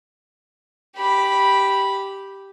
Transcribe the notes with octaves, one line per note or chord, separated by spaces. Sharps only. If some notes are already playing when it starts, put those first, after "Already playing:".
G4 B5